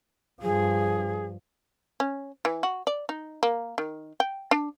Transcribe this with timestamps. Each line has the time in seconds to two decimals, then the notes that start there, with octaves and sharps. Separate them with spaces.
0.42 G2 F3 G#4
2.00 C#4
2.45 E3
2.63 F#4
2.87 D5
3.09 D#4
3.43 A#3
3.78 D#3
4.20 G5
4.51 D4